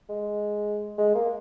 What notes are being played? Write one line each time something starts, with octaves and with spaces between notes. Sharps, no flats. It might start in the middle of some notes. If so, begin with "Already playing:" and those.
G#3
G#3
A#3